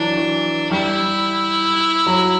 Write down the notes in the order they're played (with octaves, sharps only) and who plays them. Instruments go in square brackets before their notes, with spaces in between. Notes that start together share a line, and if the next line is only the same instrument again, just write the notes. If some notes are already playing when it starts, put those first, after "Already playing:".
Already playing: [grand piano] E3 F#3 [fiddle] D4
[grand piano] E3
[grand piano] G3 [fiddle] E4
[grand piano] F#3